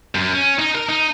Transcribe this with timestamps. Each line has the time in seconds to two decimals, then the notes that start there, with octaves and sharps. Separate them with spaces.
0.15 F#2
0.33 C#4
0.59 D#4
0.75 A#4
0.89 D#4